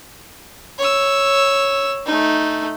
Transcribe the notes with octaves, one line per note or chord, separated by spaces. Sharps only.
C#5 E6
A3 D#4